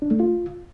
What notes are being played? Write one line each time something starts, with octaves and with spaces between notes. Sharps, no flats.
D4
A3
F4